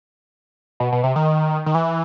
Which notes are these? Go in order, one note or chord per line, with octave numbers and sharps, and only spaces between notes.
B2
B2
C3
D#3
D#3
E3